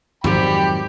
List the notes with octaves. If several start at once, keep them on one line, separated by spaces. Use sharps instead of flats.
F2 G#2 D#3 F#3 G4 G5 G#5 B5